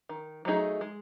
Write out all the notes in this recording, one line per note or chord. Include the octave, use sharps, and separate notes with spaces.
D#3
F#3 A3 D#4 G#4
G#3